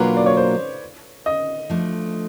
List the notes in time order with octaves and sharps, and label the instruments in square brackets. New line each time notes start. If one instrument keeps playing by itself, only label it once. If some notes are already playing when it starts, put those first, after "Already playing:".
Already playing: [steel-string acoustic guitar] B2 F#3 A#3 D4 F4 [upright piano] B4
[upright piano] D5
C#5
C5
D#5
[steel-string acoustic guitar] F3 A3 D4